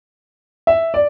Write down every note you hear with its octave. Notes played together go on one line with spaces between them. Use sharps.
E5
D5